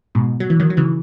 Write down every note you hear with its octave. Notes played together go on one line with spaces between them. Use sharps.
G#2 B2
F#3
E3
D#3 F#3
F#3
C#3 E3